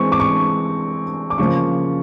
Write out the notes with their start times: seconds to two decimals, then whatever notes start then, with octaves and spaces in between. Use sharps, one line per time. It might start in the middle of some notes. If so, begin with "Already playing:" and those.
Already playing: E3 G#3 C4 C#6
0.12 D6
0.20 C#6
1.30 D6
1.38 C#3 F3 A#3 C#6